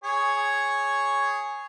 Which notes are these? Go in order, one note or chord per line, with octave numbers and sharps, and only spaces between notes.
G#4 C#5